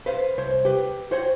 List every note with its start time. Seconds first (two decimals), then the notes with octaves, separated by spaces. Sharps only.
0.06 B4 C5 F5
0.38 C2 C5 C#5
0.65 G4 B4
1.11 F#4 C5 C#5 F#5 G5